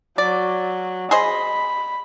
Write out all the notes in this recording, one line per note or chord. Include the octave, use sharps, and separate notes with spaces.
F#3 D5
G#4 C5 D#5 B5